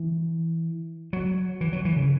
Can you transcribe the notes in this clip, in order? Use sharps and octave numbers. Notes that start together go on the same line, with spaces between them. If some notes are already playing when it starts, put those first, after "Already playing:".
Already playing: E3
F#3
E3
F#3
E3
C#3